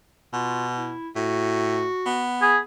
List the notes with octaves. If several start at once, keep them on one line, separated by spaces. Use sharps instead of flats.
B2 F4
E4
A2 F#4
B3
G#4 B5